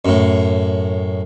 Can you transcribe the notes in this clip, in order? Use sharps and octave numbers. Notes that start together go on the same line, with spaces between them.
F#2 A2